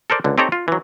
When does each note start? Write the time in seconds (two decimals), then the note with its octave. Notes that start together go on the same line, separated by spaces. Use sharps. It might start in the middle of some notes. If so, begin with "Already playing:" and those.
0.10 A4 A#4 C5 D5
0.24 C#2 D3
0.38 C4 D#4 G4 A4 C#5 A#5
0.52 F4
0.68 E3 F#3